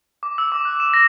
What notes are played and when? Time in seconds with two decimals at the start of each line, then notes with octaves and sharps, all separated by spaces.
0.23 D6
0.38 E6
0.52 D6
0.65 F#6
0.80 E7
0.94 A#6